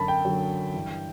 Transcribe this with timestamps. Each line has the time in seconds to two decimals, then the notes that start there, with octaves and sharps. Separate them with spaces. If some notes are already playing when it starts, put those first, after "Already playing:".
Already playing: F#2 D3 F#3 A5 B5
0.08 G5
0.25 F#2 D3 F#3
0.74 G2 E3